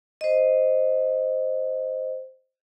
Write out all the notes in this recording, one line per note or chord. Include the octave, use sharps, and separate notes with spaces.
C5 D#5